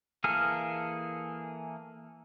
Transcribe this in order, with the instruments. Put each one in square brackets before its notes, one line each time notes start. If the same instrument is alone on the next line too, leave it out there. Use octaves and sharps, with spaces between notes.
[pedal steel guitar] E3 A#3 G#4 A4 F6